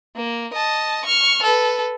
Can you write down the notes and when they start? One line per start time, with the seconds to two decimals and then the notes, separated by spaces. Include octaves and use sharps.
0.16 A#3
0.54 D#5 A5
1.05 C#6 F6
1.42 A4 B4